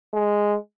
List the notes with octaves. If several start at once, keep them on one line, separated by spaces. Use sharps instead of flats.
G#3